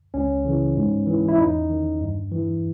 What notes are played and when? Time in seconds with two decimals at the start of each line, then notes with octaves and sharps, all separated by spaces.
0.14 C#2 C#4
0.45 C#3 E3
0.76 G#2
1.07 E3
1.28 E4
1.38 E2 D#4
1.70 D#3
2.01 G2
2.32 E3